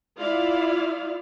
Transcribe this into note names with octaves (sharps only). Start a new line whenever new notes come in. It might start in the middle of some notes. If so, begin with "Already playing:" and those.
E4 F4 D5 F5